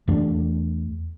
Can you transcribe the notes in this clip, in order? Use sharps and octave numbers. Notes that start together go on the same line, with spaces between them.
E2 A3 D4